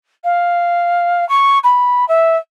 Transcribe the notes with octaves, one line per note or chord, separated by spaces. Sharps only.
F5
C#6
B5
E5